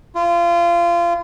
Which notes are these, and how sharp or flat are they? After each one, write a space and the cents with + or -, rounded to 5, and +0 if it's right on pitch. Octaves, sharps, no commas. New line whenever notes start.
F4 -25